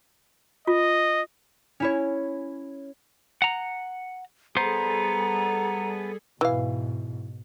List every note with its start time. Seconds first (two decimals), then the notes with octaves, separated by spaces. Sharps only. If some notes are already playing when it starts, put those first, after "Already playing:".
0.67 F4 D#5
1.80 C#4 E4 C#5
3.42 F#5 A#5
4.57 G3 B3 G#4 A4 C5 A#5
6.41 G#2 B2 E3 F5